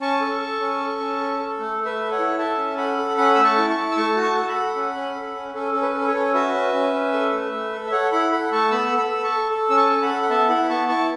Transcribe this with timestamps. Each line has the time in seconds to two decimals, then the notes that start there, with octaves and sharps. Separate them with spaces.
0.01 C#4 A5 C#6
0.21 A4
0.40 A4
0.61 C#4
0.80 A4
1.00 C#4
1.20 A4
1.39 A4
1.59 A3
1.79 A3
1.85 B4 E5
1.99 A4
2.12 C#5 F#5
2.19 E4
2.38 A4 E5 A5
2.58 C#4
2.77 A4 F#5 B5
2.98 A4
3.17 C#4 F#5 B5
3.35 A3 E6
3.44 A5 C#6
3.58 E4
3.70 A5 C#6
3.77 E4
3.92 E6
3.96 A3 A5 C#6
4.16 F#4
4.22 A5 C#6
4.37 A4
4.49 F#5 B5
4.56 A4
4.76 C#4
4.95 C#4
5.15 A4
5.35 C#4
5.54 C#4 A4
5.72 C#4 A4
5.82 B4
5.94 A4
6.01 B4
6.08 A4 C#5
6.15 C#4
6.34 F#4 B4 E5
6.54 C#4
6.73 C#4
6.94 C#4
7.14 A4
7.33 A3
7.52 A3
7.73 A4
7.87 E5
7.92 A4 C#5 F#5
8.12 E4 F#5 B5
8.32 A4 F#5 B5
8.52 A3 A5 C#6
8.71 B3 B5 E6
8.92 A4
8.98 B5 E6
9.10 A4
9.24 A5 C#6
9.31 A4
9.50 A4
9.70 C#4 E6
9.77 A5 C#6
9.90 A4
10.03 F#5 B5
10.09 A4
10.22 F#5
10.30 B3 E5 A5
10.49 E4 F#5 B5
10.69 B3 A5 C#6
10.88 E4 A5 C#6